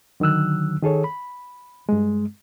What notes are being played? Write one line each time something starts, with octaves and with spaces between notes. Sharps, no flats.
D3 D#3 F#3 E6 F#6
D#3 G#4 A4 C#5
B5
G2 G#3